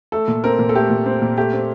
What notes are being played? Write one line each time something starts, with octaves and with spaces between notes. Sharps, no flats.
A3 A4
A#2
C4 A#4
A#2
A4
A3 G4
A#2
C4
A#2
A3 G4
C4